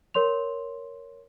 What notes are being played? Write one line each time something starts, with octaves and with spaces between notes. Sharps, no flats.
A#4 C#5 C6 F7